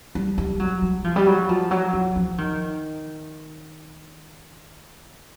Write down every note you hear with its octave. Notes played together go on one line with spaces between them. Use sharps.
G3
G3
F#3
G3
F3
G3
F#3
F3
F#3
F#3
F3
D#3